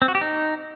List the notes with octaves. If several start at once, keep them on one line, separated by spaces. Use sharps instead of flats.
C4
F#4
G4
D#4